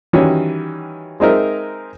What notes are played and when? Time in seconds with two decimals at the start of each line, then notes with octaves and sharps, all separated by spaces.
0.13 D#3 E3 G3 C#4 F#4
1.20 G#3 C4 D#4 A#4 E5